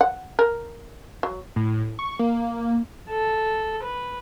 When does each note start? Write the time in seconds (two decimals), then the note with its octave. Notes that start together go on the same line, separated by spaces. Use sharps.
0.01 F#5
0.39 A#4
1.23 F#3
1.56 A2
1.99 C#6
2.19 A#3
3.10 A4
3.83 B4